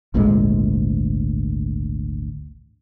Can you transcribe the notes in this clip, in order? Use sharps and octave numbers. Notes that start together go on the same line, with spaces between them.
G#1 D2 A#2 G#3